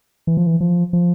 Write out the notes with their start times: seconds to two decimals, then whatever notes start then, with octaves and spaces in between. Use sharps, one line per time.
0.27 E3
0.37 F3
0.47 E3
0.61 F3
0.93 F3